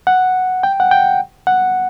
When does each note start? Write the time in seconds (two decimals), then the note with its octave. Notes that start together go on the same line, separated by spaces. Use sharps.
0.07 F#5
0.63 G5
0.80 F#5
0.91 G5
1.47 F#5